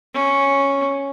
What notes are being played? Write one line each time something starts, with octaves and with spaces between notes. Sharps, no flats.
C#4